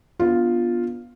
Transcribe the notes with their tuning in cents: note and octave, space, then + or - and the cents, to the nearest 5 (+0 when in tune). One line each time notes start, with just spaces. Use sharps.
B3 -20 D4 -15 F4 +0